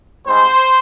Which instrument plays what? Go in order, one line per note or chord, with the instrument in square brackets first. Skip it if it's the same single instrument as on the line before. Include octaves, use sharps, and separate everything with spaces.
[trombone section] G#2 G3 C4 C5